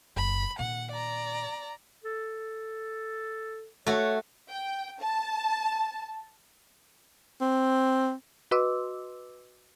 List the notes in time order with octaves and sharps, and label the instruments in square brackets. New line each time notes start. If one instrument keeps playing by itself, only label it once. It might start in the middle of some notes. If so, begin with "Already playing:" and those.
[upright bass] F#1 [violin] B5
[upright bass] A#2 D#3 [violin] F#5
[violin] D5 A#5
[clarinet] A4
[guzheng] A3 F#4 [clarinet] C#5
[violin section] G5
A5
[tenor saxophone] C4
[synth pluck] F#4 B4 D#5 C6 D6 E6